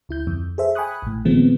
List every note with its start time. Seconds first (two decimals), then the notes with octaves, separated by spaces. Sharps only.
0.09 D2 E4 G6
0.27 F2
0.58 G#4 A4 C5 E5
0.75 G5 G#5 B5 C#6 D#6 F#6
1.02 A#1 A2
1.25 A#2 D#3 F3 G#3 B3 C4